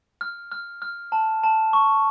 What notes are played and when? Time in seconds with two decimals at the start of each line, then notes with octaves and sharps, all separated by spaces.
0.21 F6
0.52 F6
0.82 F6
1.12 A5
1.44 A5
1.73 C#6